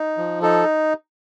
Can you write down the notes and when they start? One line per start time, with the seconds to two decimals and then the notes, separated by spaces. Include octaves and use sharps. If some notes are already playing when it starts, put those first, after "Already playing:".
Already playing: D#4
0.18 F3
0.42 D#4 A4